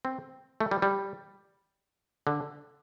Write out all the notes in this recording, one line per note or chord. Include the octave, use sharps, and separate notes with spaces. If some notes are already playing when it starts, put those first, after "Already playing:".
C4
A3
G3
G3
D3